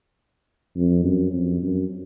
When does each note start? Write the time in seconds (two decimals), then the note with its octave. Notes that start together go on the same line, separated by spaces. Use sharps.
0.76 F2
1.04 F#2
1.33 F2
1.62 F#2